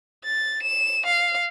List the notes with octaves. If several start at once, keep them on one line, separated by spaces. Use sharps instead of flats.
A6
E7
F5